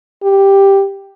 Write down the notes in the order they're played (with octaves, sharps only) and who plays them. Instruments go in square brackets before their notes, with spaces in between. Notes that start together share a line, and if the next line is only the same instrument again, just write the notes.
[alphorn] G4